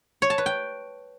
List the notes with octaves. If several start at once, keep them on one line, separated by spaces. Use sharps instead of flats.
C#5
A5
B4
G5